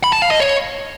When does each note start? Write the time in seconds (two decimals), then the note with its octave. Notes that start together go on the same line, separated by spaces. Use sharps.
0.04 B5
0.13 A5
0.22 F5
0.31 D#5
0.40 C#5